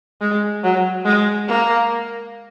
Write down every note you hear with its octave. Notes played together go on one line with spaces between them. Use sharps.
G#3
F#3
G#3
A#3